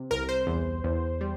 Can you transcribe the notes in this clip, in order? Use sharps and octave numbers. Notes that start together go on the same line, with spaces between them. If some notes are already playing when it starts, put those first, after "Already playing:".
Already playing: C3
C2 A#4
C5
E2
E2
G3